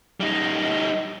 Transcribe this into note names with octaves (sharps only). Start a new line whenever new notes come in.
G3 D#4